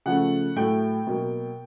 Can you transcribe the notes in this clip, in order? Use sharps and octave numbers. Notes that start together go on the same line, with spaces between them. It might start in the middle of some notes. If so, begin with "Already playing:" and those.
C#3 F3 A3 F#5
A2 F#3 A3 G5
B2 F#3 A#3